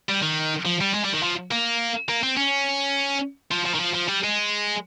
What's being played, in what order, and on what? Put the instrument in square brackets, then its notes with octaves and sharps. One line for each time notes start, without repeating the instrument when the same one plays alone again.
[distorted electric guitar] G3
D#3
F3
G3
G#3
G3
D#3
F3
A#3
A#3
C4
C#4
F3
F3
D#3
F3
F3
G3
G#3